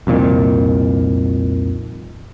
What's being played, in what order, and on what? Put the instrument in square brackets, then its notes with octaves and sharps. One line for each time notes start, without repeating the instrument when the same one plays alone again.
[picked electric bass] C2 F2 A#2 D#3